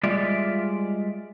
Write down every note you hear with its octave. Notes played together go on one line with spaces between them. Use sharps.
G3 G#3 F4 D5 E5